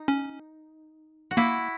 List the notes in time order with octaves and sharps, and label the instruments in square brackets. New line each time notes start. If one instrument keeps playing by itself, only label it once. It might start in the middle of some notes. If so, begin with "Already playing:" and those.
Already playing: [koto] D#4
[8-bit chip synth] C#4
[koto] F#4
[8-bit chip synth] A#3 [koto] E4